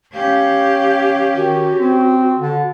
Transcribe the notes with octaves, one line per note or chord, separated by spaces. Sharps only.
C#4 G4 F5
D#3 F#4
C4
D3